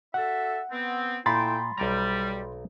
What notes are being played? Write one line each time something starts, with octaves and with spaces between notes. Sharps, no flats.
F#4 A4 E5 F#5
B3 C4
A#2 A3 E4 G5 B5 C6 A6
B1 G3 D5 A#5